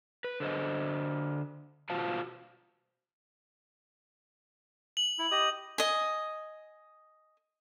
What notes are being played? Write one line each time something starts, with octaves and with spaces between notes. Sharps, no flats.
B4
D3 C5 D#5
B2 F4 F#4 C5 F5 A5
F#7
E4
G4 D#5 D#6
D#5 G#5